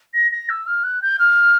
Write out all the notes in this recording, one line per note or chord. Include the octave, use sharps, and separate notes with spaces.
A#6
A#6
E6
F6
F#6
G6
F6